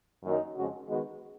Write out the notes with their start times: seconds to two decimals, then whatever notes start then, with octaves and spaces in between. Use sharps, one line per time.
0.23 F#2 D#3 F#3 A#3 D#4
0.56 F2 C#3 G#3 C#4 F#4
0.88 D#3 G#3 B3 D#4 F#4